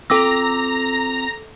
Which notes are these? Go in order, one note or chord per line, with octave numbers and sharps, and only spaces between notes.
C4 F4 A4 G5 A#5 D6 E6 A#6